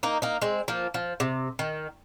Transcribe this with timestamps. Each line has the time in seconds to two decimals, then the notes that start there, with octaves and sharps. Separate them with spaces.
0.03 A#3 D#4
0.22 A#3 D#4
0.41 G#3 C4
0.68 F3 A#3
0.94 F3
1.20 C3
1.59 D#3